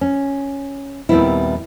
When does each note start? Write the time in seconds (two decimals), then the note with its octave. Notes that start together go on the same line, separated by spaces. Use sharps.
0.01 C#4
1.09 D#2 A#2 G3 B3 C4 E4